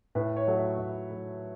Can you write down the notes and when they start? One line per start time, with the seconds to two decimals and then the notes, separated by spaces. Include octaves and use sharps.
0.15 A2 B4
0.36 C#5
0.47 F#3 A3
0.58 E5
0.79 A2 E5
1.10 F#3 A3